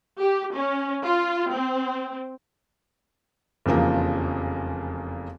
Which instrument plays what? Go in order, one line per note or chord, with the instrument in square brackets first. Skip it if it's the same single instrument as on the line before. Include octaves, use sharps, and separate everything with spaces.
[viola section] G4
C#4
F4
C4
[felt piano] F1 E2 C#3 F3 A#3